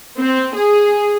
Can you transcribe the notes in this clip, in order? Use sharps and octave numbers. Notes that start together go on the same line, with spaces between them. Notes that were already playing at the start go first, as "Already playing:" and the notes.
C4
G#4